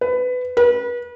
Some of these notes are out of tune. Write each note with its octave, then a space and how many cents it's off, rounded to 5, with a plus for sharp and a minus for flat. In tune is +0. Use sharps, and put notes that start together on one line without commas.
B4 +20
B4 -35